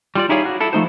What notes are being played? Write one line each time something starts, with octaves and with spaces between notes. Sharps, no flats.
G3 F4 D5
D#4 E4 G4 G#4 C#5 F5
F#4
E4 A4
F3 A3 D#4 C5